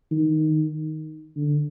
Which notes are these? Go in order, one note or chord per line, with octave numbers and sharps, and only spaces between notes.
D#3
D3